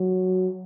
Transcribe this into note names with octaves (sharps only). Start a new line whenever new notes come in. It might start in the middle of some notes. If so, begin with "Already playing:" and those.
Already playing: F#3